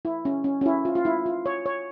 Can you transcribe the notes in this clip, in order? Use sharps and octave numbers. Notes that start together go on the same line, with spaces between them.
E4
C#4
C#4
C#4
E4
F4
F4
E4
F4
C#5
C#5